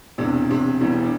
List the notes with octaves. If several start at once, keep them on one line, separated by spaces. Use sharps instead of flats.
E1 E2 C3 D4
E1 E2 C3
E1 E2 E3 G3
D4